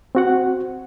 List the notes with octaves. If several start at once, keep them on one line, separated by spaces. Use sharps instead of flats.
C4 F#4 F#5